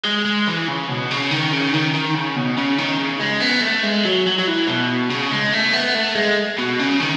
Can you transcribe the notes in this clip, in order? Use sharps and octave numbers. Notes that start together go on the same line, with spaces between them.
G#3
G#3
E3
C#3
B2
C#3
D#3
C#3
D#3
D#3
C#3
B2
C#3
D#3
C#3
G#3
B3
A3
G#3
F#3
F#3
F#3
E3
B2
C#3
G#3
A3
B3
A3
G#3
B2
C#3
D#3